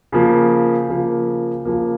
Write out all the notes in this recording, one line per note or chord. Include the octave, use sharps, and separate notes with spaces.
C#3 F3 A#3
C#3 F3 A#3
C#3 F3 A#3